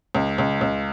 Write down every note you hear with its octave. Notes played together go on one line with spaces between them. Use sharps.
C#2
C#2
C#2